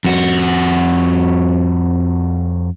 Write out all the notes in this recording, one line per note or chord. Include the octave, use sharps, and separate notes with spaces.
F2 F#4